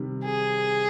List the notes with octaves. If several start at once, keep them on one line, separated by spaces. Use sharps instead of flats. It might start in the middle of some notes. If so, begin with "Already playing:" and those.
Already playing: C3 D#3 G3
G#4